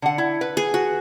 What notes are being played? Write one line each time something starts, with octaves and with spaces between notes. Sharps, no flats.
D3 F#5
E4
B4
G#4
F#4